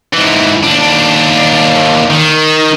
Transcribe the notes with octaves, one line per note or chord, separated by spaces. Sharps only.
G#2 E3
D#2 D4
D#3